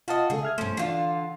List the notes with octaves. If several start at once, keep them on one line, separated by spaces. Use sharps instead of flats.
F4 F#4 D#5 F5 A5
C#3 G#3 G#4 A4
E5 F6 G#6
G2 F3 A3 C#4
D3 E3 D4 F4